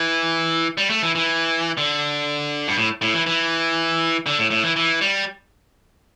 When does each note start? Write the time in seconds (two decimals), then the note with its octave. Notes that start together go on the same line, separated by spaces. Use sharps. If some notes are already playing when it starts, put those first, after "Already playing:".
Already playing: E3
0.78 G3
0.90 A3
1.02 E3
1.15 E3
1.77 D3
2.68 G2
2.77 A2
3.02 A2
3.14 E3
3.27 E3
4.26 D3
4.39 A2
4.51 A2
4.64 E3
4.76 E3
5.01 G3